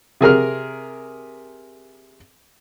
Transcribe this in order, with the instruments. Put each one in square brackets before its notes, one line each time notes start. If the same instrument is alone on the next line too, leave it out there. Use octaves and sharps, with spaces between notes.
[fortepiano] C3 G#4 A#4 F6